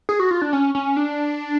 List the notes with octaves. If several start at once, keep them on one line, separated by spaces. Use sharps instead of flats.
G#4
F#4
F4
D4
C#4
C#4
D4